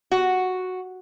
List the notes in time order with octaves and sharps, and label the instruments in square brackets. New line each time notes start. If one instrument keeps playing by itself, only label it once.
[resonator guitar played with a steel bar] F#4